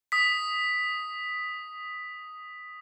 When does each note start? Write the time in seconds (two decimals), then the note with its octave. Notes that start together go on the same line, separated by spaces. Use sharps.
0.12 D#6 B6